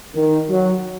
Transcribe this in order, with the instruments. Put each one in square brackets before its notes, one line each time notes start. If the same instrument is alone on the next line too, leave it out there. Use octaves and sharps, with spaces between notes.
[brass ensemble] D#3
F#3